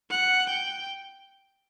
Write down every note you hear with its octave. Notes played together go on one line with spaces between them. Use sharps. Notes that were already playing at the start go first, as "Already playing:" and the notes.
F#5
G5